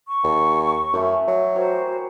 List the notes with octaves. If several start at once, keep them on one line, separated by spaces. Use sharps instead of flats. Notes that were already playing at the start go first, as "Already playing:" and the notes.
C#6
D#2
F#2 E3 A3 E4
F#3
F#4 G4 A#4 C5 C#5